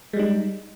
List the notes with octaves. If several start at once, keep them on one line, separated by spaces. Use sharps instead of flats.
G3 G#3 D#4